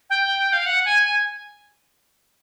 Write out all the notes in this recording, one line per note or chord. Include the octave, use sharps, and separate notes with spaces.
G5
F5
F#5
G#5
G#5